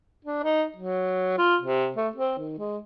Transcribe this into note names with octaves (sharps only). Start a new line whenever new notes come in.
D4
D#4
F#3
F4
C3
A3
C4
D#3
G#3